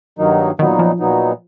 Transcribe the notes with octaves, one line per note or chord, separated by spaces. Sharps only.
G2 D#3 F#3 A#3 D#4
A#2 D#3 F#3 B3 D#4
F3
A#2 F#3 B3 D#4